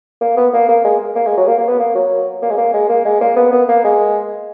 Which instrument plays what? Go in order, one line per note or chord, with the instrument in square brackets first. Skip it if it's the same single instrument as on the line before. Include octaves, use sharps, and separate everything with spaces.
[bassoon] A#3
B3
A#3
A#3
G#3
A#3
G#3
F#3
A#3
A#3
B3
A#3
F#3
A#3
G#3
A#3
G#3
A#3
G#3
A#3
B3
B3
A#3
G#3